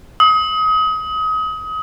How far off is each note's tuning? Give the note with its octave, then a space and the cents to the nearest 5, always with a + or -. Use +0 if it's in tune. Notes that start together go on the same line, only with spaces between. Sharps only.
D#6 +30